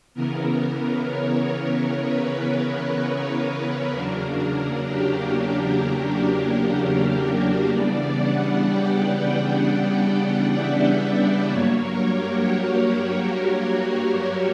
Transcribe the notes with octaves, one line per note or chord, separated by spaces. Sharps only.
C#3 E3 B3 A#4
C#5
B4
A#4
E2 C#3 F#3 A#3 D4
G4
A#4
C#3 E3 G3 B3 D4 D5
F#5
G5
E5
G2 F#3 A#3 C#5
A#4
G4
F#4
F#4
F#4